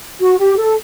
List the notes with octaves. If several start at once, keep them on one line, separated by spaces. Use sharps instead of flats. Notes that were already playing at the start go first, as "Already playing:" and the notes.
F#4
G4
A4